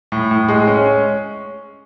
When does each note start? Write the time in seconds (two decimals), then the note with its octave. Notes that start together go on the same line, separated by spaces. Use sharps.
0.12 A2
0.31 A2
0.48 G#3
0.68 C#4